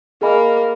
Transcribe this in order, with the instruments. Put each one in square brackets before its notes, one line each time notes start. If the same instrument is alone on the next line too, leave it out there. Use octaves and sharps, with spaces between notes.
[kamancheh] A#3 [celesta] G#4 D#5 G#5 B5